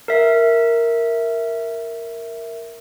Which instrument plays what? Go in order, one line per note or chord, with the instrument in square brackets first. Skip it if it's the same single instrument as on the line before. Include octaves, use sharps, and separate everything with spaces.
[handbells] A#4 E5